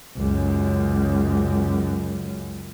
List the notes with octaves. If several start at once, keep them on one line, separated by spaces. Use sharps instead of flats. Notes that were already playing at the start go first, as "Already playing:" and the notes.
C#2 F#2